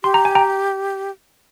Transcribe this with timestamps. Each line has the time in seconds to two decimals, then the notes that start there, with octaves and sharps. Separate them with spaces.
0.04 G4 C6
0.14 A#5
0.25 G#5
0.35 G5 A#5